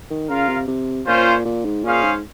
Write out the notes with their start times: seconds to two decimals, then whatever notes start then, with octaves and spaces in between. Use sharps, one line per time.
0.10 D#3
0.30 C#3 F4 A#4 F5
0.48 C3
0.68 C3
1.07 A#2 C#4 F4 C5
1.45 A#2
1.65 G#2
1.84 A#2 C#4 G#4 C5 F5
2.04 G#2